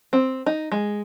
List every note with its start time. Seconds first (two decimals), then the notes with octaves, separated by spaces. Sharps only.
0.13 C4
0.46 D#4
0.72 G#3